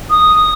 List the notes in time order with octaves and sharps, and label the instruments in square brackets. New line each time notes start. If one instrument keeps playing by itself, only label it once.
[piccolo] D#6